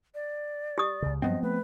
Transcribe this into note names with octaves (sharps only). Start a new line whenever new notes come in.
D5
G4 D#6
C#2 C#3
G2 F3 F#3 B3 C4 D#5
A3 B4